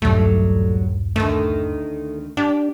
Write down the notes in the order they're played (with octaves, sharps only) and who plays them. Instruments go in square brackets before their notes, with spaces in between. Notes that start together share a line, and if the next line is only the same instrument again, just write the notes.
[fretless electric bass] D#1 B1 G2 [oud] F#3 G3 [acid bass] A3
[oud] D2 D#3 [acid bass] A3
[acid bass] D4 [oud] G4